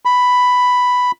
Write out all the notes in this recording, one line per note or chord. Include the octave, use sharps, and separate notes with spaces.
B5